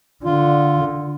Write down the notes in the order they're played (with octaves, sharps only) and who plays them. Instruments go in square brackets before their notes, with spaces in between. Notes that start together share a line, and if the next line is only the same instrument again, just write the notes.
[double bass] D3 [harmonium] F4